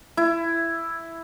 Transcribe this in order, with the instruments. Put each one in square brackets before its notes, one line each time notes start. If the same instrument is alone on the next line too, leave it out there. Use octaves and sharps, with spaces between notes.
[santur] E4